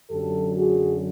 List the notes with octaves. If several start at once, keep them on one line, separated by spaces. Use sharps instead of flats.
F#2 D3 F#3 G4 A4
F#4 G#4